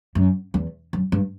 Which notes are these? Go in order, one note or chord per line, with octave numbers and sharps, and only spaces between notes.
F#2
E2
F#2
G2